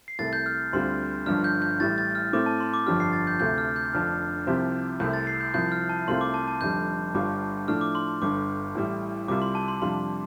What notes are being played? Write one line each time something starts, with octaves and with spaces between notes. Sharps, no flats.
C7
C2 C3 A3 A6
G6
F6
D2 D3 G3 C4 F4 C6
G1 G2 F3 D4 F6
G6
G6
A1 A2 G3 A6
A6
F6
A2 A3 C4 D6
A5
C6
D6
G1 F2 F3 D4 G4 F6
C7
A6
G6
D2 C3 A3 F4 G6
F6
G6
F1 F2 D3 F3 D4 F6
C2 C3 F3 C4 G4
C2 C3 A3 C4 G6
A6
C7
G6
C2 C3 F3 G6
F6
A5
C2 C3 A3 C4 F4 C6
D6
A5
A5
F1 F2 D3 G3 G6
G1 G2 G3 D4 F4 D6
A2 F3 A3 D4 F6
D6
C6
C6
G1 G2 D3 D6
A1 A2 G3
C2 C3 G3 F4 D6
C6
A5
C6
F2 C3 G3 D4 F4 C6